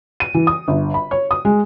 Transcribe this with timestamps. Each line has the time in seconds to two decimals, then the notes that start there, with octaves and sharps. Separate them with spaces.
0.20 D#7
0.34 E3
0.47 D#6
0.68 G1
0.94 B5
1.11 C#5
1.31 D#6
1.45 G#3